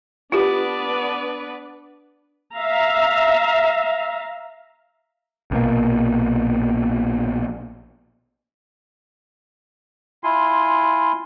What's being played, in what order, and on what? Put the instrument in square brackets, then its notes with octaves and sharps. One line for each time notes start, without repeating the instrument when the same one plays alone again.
[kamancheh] B3 [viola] D4 D5 [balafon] F4 G4 [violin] B4
[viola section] E5 F5 A#5
[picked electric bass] A#1 B2 A#3
[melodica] E4 F4 G#5 C6